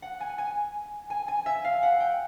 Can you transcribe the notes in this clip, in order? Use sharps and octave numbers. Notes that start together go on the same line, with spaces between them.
F#5
G#5
G#5
G#5
G#5
E5
F5
F#5
G5